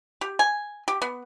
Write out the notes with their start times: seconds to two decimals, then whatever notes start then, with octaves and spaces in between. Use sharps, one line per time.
0.21 G4
0.39 G#5
0.88 G4
1.02 B3